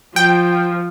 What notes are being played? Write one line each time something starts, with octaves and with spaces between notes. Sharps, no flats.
F3 G5